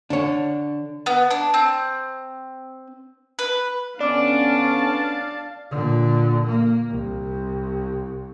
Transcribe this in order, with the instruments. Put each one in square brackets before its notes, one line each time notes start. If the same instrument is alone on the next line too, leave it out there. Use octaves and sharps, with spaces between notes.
[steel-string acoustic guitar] D3 [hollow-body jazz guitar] D4 C#5
[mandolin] B3
D4
C4
B4
[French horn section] D3 B3 C#4 [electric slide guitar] D4 [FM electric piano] D5 D6 [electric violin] F5 A5
[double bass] A#2 D3
A#3
C2